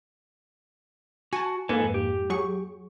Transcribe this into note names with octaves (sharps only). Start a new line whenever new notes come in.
F#4 G#5 A5
F2 G#2 A#3 A4 B4 G#5
G4
F#3 G#4 C#6